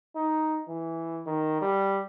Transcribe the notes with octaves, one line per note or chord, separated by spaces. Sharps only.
D#4
E3
D#3
G3